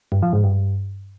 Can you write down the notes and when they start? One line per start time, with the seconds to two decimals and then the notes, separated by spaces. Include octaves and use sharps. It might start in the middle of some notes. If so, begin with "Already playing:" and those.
0.12 G2
0.22 F3
0.33 G#2
0.44 G2